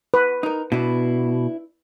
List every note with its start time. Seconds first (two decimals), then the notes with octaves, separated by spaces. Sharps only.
0.14 B4
0.43 D#4 A#4
0.72 B2 B3 D4 E4